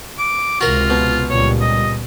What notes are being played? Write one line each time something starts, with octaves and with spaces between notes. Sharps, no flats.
D6
C#2 C3 F4 F#4 A#4
B2
C#2 A#2 G3 C#5
D#5